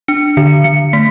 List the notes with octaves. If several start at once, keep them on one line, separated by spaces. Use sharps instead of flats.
D4 C#7
D3 C#7
D3 C#7
A3 B6